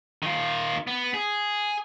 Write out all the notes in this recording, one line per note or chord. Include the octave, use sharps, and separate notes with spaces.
D#3 F4
B3
G#4